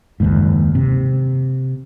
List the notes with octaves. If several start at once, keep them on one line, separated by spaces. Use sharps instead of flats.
F#1 D#2 G#2
C3